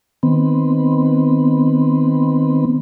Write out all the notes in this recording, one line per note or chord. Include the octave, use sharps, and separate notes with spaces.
D#3 B3 C4